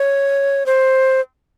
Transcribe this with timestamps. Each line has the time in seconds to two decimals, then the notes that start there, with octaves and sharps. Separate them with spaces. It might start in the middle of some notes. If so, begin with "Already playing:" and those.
Already playing: C#5
0.66 C5